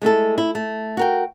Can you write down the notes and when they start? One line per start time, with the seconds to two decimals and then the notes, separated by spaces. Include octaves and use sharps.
0.02 G#3 A3 E4 A4
0.38 E4
0.55 A3
0.97 F#4 A#4 G5